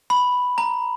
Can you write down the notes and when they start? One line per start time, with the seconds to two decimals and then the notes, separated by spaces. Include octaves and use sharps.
0.10 B5
0.58 A#5